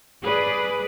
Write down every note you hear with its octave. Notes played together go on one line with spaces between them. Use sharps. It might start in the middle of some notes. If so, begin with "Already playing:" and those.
G#4 B4 D5